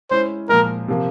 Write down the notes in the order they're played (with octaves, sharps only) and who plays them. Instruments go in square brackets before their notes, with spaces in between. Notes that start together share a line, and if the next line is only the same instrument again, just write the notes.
[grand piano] G#3 C#4 E4 [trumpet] C5
[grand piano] A#2 F3 G#3 [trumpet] A#4
[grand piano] C3 F3 A#3